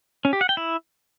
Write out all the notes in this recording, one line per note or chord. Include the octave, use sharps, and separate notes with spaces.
C#4
G4
F#5
G5
E4